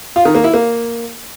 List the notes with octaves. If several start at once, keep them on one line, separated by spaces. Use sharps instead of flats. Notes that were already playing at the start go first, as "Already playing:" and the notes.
F4
D#3
A#3
E4
A#3